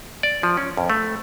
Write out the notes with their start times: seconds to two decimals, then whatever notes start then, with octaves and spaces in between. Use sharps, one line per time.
0.23 D5
0.43 F3
0.57 C#4
0.77 F2
0.90 A3